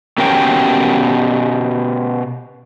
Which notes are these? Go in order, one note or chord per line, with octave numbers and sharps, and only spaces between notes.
B2 C#4 G4 A#4 C#5 G5